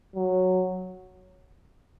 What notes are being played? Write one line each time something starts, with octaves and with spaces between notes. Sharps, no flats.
F#3